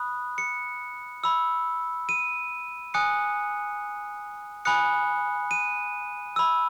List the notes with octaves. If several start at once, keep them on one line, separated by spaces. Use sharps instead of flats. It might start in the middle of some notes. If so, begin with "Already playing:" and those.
Already playing: B5 D#6 F#6
C#7
B5 E6
D#7
G#5 D#6 F#6 C#7
G#5 B5 D#6 F#6 C#7
D#7
B5 E6